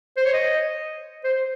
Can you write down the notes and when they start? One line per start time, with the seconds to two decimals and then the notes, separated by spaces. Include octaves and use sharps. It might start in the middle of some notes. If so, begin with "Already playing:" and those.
0.17 C5
0.25 C#5
0.33 D#5
1.24 C5